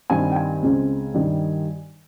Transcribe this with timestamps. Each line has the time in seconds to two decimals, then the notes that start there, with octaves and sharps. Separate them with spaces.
0.10 G2 D#3 G3 C4 G#5
0.32 G5
0.36 G#5
0.63 C#2 C#3 G#3 C4
1.14 G2 D#3 G3